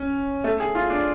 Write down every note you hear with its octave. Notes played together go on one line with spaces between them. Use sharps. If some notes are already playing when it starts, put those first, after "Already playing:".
Already playing: C#4
A3
G#4
F4
D4